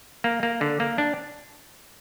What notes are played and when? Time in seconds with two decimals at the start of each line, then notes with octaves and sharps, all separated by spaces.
0.24 A#3
0.43 A#3
0.61 D3
0.80 A#3
0.98 D4